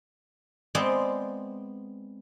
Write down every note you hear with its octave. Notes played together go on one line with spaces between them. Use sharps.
G#3 B3 C4 D5